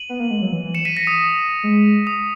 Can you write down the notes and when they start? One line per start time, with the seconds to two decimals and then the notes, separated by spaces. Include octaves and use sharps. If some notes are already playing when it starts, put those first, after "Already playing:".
Already playing: D#7 F#7
0.09 B3
0.20 A#3
0.31 G#3
0.42 F#3
0.52 E3
0.64 E3
0.74 C#7 E7
0.85 B6 D#7
0.97 A#6 C#7
1.07 D#6
1.63 G#3
2.07 D#6